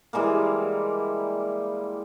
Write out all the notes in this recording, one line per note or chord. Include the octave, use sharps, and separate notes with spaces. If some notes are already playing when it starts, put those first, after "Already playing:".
E3 G3 G#3 A#3